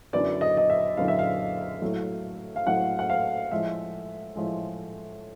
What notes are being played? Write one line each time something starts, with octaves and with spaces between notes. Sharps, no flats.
F#2 D3 F#3 B3 E4 D5
D#5
D#5
E5
F#2 D3 F#3 B3 E4 F5
E5
F5
A2 F#3 A3
F5
A2 F#3 A3 F#5
F#5
F5
A2 F3 G#3 E5
A2 F3 G#3